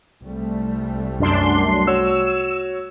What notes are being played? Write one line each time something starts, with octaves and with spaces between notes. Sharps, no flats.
C2 G3 A3
F#2 D4 C6
F#4 C#5 E6